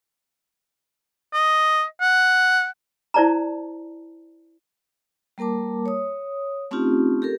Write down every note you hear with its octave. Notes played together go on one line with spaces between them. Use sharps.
D#5
F#5
E4 C5 D5 A5 A#5
G3 A#3 A#4 A5 D6
C#5 D#6
A3 C4 C#4 D#4 F4 G4
G4 A4 A#4